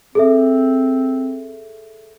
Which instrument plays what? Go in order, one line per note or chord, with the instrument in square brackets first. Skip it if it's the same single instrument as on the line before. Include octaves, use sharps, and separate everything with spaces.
[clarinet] C4 [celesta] G#4 A4 E5